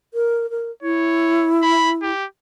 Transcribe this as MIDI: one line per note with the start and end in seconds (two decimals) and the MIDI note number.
0.14 0.50 70
0.50 0.71 70
0.82 2.11 64
0.82 1.51 73
1.63 1.91 83
2.02 2.25 67